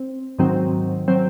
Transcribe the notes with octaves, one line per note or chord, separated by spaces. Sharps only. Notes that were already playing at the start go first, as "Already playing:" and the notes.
Already playing: C4
G#2 D#3 F#3 C4
F#3 C4